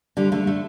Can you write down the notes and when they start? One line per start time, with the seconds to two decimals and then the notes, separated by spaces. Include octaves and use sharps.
0.17 D3 G3
0.32 D3 A3
0.47 A3